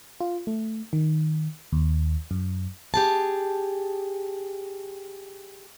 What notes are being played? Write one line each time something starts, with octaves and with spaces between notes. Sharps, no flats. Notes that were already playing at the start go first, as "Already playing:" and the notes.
F4
A3
D#3
D#2
F#2
G4 G#4 A5